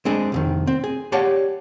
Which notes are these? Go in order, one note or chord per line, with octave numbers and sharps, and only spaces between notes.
G#3 C4 D4 G#4
C2 F2 D#3
C4
G#4
G4 C#5 D5 F5 F#5 A5